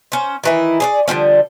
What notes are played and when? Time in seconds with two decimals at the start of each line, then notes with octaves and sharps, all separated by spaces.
0.12 C#4 C5
0.44 D#3 E3 E4
0.80 G#4 C#5 D5
1.08 D3 F3 G3 C#4